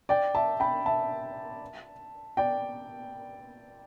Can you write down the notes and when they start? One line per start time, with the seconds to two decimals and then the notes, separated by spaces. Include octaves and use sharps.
0.09 D5 G5
0.35 E5 A5
0.60 G5 B5
0.86 E5 A5
2.37 D5 G5